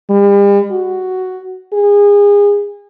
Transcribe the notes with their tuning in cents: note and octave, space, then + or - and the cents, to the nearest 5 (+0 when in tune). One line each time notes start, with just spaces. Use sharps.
G3 +40
F#4 +5
G#4 -30